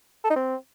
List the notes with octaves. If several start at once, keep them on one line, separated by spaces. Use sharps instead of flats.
A4
D#4
C4